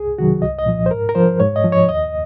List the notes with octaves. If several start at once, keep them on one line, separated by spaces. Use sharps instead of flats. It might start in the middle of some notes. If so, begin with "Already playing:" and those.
Already playing: C2 G#4
C3 D#3 F#3 F#4
C2 D#5
D#5
A#2 F3
C5
G#2 A#4
A#4
F3 C5
G#2 C#5
D#5
F3
C#5
D#2 D#5